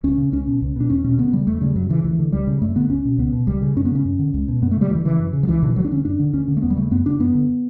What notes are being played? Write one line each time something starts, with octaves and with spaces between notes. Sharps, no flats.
C#2 C#4
C#3
C#2 C#4
B2
C#2
B2 D4
E2 C#4
B2 C#4
D2 B3
C#3 G3
E2 A3
C#3 G3
F#2 F#3
C#3 E3
D2 E3
D3
C#2 G3
C#3
F#2 A3
D3 B3
C#2 C#4
B2
C#2 B3
B2
C#2 G3
C#3
F#2 C#4
B3
C#3 C#4
F#2
D3
C#2
B2
F#2 B3
A3
C#3 G3
D2 E3
C#3 E3
F#2
C#3
F#3
C#2 E3
B2 D3
E3
D2 F#3
D4
D3 C#4
F#2 D4
D3
D2 C#4
D3
A3
E2 B3
G3
C#3 A3
F#2 B3
C#3 D4
F#2 B3
D3